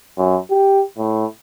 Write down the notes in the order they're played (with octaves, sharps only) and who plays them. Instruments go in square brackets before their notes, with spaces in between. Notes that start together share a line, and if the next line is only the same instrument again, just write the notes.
[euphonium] F#2
G4
A2